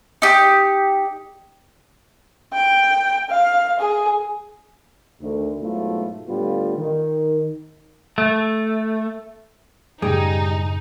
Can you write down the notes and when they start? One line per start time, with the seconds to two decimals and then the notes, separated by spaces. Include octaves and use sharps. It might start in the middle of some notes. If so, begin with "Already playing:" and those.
0.22 D#4 G4
2.53 G5
3.30 F5
3.80 G#4
5.21 D2 D#3 A3
5.62 G#2 B2 F#3 A3 E4 F4
6.28 A2 D3 G3 B3 F4
6.78 D#3
8.18 A3
10.02 F#2 A2 C#3 G3 D#4 G#4